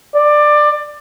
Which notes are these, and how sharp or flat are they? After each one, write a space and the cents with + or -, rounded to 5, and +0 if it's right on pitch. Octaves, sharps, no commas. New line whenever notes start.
D5 +20